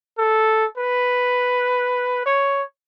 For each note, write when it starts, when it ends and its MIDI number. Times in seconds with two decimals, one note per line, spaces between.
0.18 0.66 69
0.78 2.23 71
2.26 2.63 73